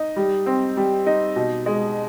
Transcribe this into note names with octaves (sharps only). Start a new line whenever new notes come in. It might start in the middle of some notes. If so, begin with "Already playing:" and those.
Already playing: D#4
G3
C4
G3
D#4
B2
G#3